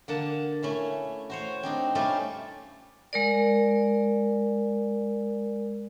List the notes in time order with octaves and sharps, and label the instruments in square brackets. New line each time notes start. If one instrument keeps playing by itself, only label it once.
[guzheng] D3 A#3 F#5 A5
A3 C#4 E4
F#4 C5 C#5
C4 D4 D#4
G3 A3 C#4 F4 G4 A4
[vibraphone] G#3 A#4 D5